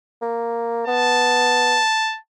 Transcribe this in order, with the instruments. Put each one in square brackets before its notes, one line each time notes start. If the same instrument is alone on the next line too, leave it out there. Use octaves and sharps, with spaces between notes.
[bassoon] A#3
[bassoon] B3 [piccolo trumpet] A5